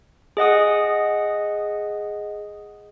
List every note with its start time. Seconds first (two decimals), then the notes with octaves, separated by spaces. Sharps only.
0.37 G#4 D#5 F#5 D#6